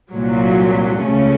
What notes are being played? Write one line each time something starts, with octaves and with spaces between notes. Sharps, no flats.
C2 A#2 F#3
C#2 C#3 A3 C#4